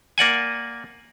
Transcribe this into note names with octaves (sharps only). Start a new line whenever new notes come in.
A#3 D5 F#5 G#5